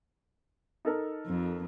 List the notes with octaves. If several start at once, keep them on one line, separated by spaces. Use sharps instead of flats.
D#4 A4 A#4
F2